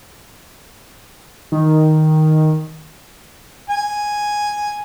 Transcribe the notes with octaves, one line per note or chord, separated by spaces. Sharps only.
D#3
G#5